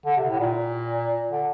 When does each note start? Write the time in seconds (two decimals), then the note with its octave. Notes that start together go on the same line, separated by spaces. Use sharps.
0.06 D3
0.17 C3
0.29 A2
0.40 A#2
1.31 D3